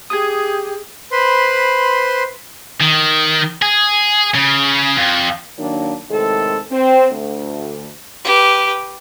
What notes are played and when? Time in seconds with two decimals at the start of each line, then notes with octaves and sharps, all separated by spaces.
0.10 G4 G#4 D#6 G#6
1.12 B4 C5 B5 C6
2.81 D#3
3.62 G#4
4.34 C#3
4.97 F2
5.58 D#3 F#3 A#3 D4
6.10 A2 C3 D#3 G#3 A4
6.72 C4
7.11 D2
8.24 G4 B4